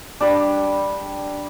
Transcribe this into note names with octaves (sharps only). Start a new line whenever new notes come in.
G3 D4